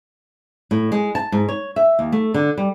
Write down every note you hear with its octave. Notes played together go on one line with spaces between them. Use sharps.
A2
G#3
A5
G#2
C#5
E5
D#2
A3
D3
G3